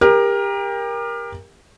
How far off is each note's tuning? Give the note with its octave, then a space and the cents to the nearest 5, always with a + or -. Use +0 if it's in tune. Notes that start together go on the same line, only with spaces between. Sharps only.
G4 +30 A#4 +15